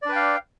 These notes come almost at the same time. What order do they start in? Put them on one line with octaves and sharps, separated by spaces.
D5 D4 B4 G5 F5